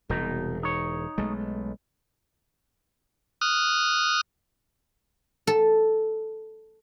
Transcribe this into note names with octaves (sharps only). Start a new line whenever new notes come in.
E1 C2 B2 D#4
D#4 C#5
B1 G#3 A3
D#6 F6 F#6
A4